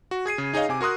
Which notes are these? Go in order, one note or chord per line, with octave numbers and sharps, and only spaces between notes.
F#4
G#4 G#6 C7 D#7
C#3
D#4 G#4 C#5 D#5 F5
C3 G#5 D6
F#4 A#4 C6 D#6 F#6